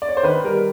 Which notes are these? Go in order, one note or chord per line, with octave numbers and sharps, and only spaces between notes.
D5
C#5
C5
D#3 B4
G3 A#4